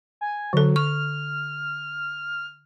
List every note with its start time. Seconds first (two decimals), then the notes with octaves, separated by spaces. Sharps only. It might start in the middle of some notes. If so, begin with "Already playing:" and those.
0.21 G#5
0.53 D3 F#3 A4
0.76 C#6 F6